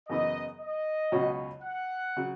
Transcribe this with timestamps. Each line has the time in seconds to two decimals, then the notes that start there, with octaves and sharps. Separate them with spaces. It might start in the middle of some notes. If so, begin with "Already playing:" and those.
0.09 F#2 C#3 E3 B3 D#5
0.60 D#5
1.12 C#2 B2 F#3 C#4 F#4
1.62 F#5
2.17 C#3 F#3